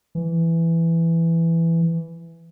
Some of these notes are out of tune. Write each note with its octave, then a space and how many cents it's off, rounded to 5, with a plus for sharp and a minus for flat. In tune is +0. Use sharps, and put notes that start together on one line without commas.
E3 +10